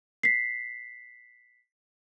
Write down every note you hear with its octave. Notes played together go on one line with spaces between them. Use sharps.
B6 C7